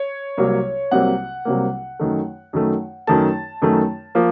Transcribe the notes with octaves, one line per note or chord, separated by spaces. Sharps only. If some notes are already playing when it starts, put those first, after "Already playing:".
Already playing: C#5
C2 C3 F#3 A#3
C2 C3 F#3 A#3 F#5
C2 C3 F#3 A#3
F#2 D#3 A3
F#2 D#3 A3
F#2 D#3 A3 A5
F#2 D#3 A3
F3 A#3